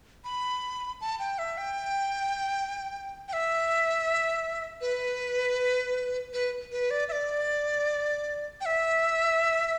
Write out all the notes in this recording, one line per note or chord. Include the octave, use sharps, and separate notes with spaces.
B5
A5
G5
E5
G5
G5
E5
B4
B4
B4
D5
E5
D5
G5
E5